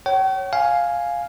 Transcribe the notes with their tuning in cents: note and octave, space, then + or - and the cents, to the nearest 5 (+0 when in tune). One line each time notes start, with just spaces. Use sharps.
C#5 +0 G5 -45
F5 +5 G#5 +0